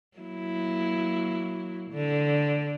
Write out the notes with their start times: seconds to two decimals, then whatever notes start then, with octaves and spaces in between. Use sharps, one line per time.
0.18 F#3 A#3 E4
1.91 D3